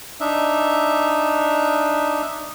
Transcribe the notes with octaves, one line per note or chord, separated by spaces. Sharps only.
D4 D#4 E5